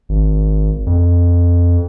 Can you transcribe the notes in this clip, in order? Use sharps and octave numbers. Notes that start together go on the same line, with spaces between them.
G#1
F2